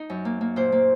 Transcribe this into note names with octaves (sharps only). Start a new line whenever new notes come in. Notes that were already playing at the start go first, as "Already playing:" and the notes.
Already playing: D#4
F#2
A#3
A#3
A#2 C5
A#3